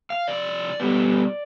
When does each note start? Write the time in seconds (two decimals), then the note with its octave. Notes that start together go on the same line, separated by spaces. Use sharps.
0.10 F5
0.28 F2 C3 D5
0.80 B2 G3 B3